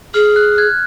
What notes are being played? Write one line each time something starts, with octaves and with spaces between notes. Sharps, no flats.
G#4 F6
F#6
F#6 G#6